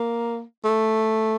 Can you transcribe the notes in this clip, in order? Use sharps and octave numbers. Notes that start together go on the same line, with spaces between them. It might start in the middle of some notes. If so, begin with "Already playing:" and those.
Already playing: A#3
A3